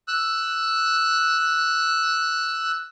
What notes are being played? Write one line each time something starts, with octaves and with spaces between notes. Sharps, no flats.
E6 F#6